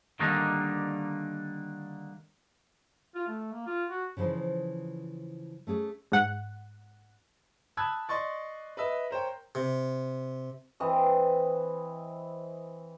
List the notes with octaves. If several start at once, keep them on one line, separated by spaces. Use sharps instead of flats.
D3 D#3 G3 A#3 D4 D#4
F4
A3
A#3
F4
F#4
C#3 E3 F3 D#4 C5
A3 C#4 G#4
G#2 F#5
A5 B5 D#6 E6 F#6 G#6
D5 D#5 C6 C#6 A6
B4 D#5 E5
A#4 C5 C#5 G5
C3
E3 C4 D#5